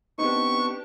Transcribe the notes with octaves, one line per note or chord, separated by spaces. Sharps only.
B3 C4 D4 D#4 G4 C#6